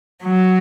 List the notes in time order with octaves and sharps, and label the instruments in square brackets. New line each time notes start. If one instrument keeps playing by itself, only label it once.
[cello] F#3